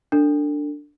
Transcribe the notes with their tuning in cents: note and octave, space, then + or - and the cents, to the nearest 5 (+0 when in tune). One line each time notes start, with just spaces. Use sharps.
D4 +0 A4 +35